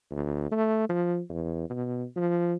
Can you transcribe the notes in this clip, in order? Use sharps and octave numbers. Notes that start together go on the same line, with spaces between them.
D2
A3
F3
E2
B2
F3